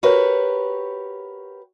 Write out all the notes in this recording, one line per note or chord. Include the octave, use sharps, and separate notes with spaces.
F#4 G4 A#4 B4 C#5